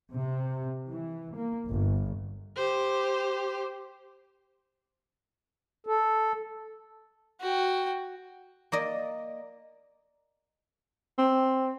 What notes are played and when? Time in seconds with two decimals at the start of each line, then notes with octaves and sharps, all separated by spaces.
0.15 C3
0.88 E3
1.35 A#3
1.69 G1
2.57 G4 C5
5.87 A4
7.41 F#4 G5
8.72 A#3 D5 D#5
11.18 C4